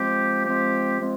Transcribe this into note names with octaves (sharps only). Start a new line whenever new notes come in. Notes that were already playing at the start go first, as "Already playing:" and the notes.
Already playing: F3 G#3 C4 G4
F3 G#3 C4 G4
F3 G#3 C4